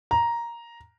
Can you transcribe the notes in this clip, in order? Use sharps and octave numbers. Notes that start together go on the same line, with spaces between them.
A#5